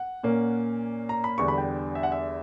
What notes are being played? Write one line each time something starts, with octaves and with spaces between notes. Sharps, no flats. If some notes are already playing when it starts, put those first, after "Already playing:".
Already playing: F#5
A#2 A#3 C#4
A#5
B5
E2 D3 G3 B3 D4 C#6
B5
G5
E5
F#5
E5